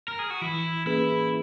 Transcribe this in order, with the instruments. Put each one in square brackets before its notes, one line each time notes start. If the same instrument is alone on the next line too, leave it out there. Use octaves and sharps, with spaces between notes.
[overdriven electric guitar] A#4
G#4
F#4
[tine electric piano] E3 [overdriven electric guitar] E4
[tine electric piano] A#3 C#4 G#4 B4 [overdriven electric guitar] E4